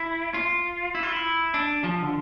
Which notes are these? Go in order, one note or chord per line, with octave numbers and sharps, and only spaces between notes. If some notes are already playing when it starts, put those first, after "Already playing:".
Already playing: E4
F4
E4
F4
E4
D4
F3
D3